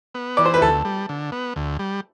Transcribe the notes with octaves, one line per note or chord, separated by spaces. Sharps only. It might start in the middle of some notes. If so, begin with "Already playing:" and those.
B3
E3 D5
C5
B4
D2 A4
G3
D3
B3
D2
G3